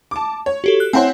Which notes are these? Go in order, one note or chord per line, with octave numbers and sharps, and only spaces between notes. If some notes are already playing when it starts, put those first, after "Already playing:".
A5 D6
C#5
F#4 G4 A4
F#6
C4 E4 C5 C#5 F#5 G#5